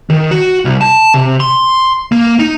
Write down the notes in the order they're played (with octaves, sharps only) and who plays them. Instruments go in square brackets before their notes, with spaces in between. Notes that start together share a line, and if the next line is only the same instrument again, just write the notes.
[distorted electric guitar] D#3
F#4
C2
A5
C3
C6
A#3
D#4